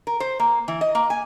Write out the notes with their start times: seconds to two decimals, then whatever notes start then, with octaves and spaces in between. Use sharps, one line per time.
0.07 A#4
0.20 C5
0.40 A#3
0.68 E3
0.81 D#5
0.95 A#3
1.10 G#5